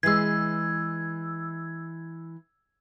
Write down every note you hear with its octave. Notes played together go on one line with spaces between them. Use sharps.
E3 G#3 E6 G#6